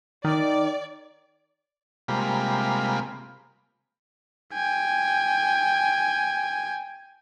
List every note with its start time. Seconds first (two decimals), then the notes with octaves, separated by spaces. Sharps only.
0.24 D#3 D5
2.08 C3 G3 G#3 A#3 F4 B5
4.53 G5 G#5